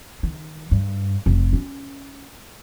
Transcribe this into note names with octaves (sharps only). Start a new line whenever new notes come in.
D#3
G2
F1
C#4